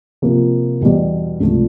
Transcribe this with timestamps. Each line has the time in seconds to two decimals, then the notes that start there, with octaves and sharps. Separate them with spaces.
0.22 C3 F3 A#3
0.81 E2 B2 G3
1.40 C#2 C3 F3 A3 D4